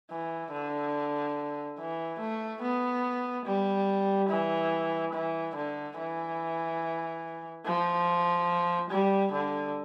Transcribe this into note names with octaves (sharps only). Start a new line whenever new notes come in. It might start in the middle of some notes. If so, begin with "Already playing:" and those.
E3
D3
E3
A3
B3
G3
E3
E3
D3
E3
F3
G3
D3